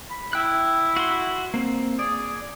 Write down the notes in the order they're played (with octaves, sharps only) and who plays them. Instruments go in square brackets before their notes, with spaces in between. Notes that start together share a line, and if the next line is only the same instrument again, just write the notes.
[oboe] B5
[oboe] E4 [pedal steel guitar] G5 F#6
[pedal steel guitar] F#4 C6
A#3 C4
[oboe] G#4 [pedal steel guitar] D5